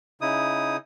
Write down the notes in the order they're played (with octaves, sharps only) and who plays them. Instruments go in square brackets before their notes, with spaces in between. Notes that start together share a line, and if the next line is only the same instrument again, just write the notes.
[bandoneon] C#3 D#4 E4 D#6